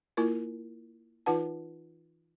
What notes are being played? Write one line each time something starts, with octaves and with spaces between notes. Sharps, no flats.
A#3 E4 F4 A#4
E3 D#4 F4 B4 F#5 A5